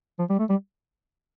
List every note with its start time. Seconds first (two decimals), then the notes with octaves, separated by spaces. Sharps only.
0.19 F3
0.30 G3
0.39 A3
0.50 G3